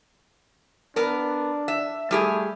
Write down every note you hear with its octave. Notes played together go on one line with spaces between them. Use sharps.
B3 D4 A#4
E5
G3 A3 G4 G#4